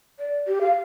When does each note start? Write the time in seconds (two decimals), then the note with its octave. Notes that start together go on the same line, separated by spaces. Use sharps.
0.20 D5
0.47 G4
0.61 F5